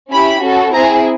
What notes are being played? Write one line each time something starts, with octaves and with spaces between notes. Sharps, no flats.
C#4 E4 G4 B5
C#4 F#4 A4
C4 E4 G#4 A#5